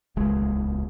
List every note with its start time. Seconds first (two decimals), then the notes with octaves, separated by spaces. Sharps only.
0.16 D#1 C#2 G#3